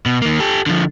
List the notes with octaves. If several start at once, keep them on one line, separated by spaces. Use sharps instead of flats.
B2
D#3 A#3
G4 A4
D3 F3